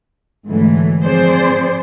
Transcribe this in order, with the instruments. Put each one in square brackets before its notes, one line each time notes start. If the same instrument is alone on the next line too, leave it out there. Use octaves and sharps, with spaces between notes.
[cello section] G#2 D3 E3 F#3 A3
F3 C4 G#4 C5 D5